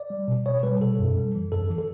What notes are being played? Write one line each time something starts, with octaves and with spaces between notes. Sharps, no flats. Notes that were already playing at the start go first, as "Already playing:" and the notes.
Already playing: D5
G3
B2
B2 C#5
G3 B4
B2 A4
F#2
G3
E3
F#2 A4
E3
A4